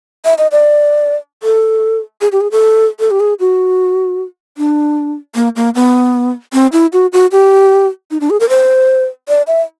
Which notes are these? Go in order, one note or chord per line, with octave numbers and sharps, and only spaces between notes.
E5
D#5
D5
A4
G#4
G4
G#4
A4
A4
G4
G#4
F#4
D4
A#3
A#3
B3
C4
E4
F#4
F#4
G4
D#4
D4
G#4
A#4
C5
D5
E5